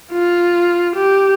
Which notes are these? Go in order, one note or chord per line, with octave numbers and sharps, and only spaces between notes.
F4
G4